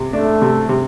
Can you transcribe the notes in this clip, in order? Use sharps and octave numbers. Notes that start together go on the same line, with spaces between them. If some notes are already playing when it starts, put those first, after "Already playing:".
Already playing: C3
A3 D4
C3
C3